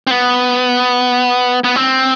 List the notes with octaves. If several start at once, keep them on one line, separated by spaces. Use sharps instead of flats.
C4
B3
B3
C4